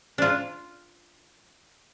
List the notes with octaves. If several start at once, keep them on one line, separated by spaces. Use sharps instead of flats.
D4 F4